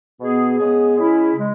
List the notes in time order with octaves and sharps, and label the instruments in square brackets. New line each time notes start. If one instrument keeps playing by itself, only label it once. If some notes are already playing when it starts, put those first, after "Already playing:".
[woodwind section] B2 B3 G#4
C#3 G#3 B3 G#4
C#3 G#3 C#4 E4 G#4
C#3 G#3